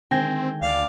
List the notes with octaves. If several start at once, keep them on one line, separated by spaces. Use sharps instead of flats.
D3 D#3 G#3 C4 G5 G#5 A#6
D2 D5 F5